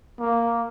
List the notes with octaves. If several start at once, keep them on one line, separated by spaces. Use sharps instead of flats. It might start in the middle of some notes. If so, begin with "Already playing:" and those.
A#3